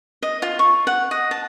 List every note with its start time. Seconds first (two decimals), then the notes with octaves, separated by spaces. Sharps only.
0.23 D#5
0.42 F4
0.59 C#6
0.87 F#5
1.11 D#5
1.31 A5